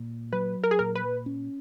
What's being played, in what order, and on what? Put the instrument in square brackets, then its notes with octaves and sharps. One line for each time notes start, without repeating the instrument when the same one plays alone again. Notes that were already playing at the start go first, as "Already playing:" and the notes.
Already playing: [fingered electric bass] A#2
[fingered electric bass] F#3 [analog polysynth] B4
[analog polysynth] A#4
G#4
[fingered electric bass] A#2 [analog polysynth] A#4
[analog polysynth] B4
[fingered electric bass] C#4